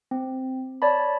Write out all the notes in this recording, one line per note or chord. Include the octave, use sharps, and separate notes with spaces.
C4
C#5 D5 A5 B5